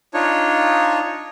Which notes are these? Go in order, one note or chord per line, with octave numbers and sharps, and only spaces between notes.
D4 D#4 F4 C#5